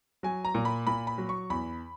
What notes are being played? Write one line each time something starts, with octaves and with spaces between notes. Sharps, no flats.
F#3 G#5
A#5
A#2
B5
A#2 B5
B5
F#3
C#6
E2 B5